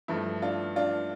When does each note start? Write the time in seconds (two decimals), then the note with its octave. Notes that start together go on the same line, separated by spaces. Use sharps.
0.08 G2 F3 A3 E4
0.42 D4 F4
0.76 D4 F4